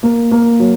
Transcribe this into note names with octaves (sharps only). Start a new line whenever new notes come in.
A#3
A#3
F#3